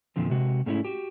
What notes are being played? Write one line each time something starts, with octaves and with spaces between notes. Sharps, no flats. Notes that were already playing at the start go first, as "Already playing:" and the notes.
E2 A#2 D3 F3 C4
C3 G#3 F#4
G#2 A3 C#4 D#4 E4
F#4 G4